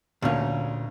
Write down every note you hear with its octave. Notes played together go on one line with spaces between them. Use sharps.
D2 A#2 C#4 F5